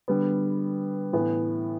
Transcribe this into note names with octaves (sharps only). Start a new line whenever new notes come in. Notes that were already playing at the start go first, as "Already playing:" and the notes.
D3 G3 B3
A2 E3 B3